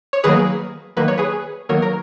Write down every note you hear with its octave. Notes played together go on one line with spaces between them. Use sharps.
C#5
D#3 F#3 A#3 G#4 B4
D#3 F#3 A#3 B4
C#5
G#4 B4
D#3 F#3 A#3 A#4 C#5
A#4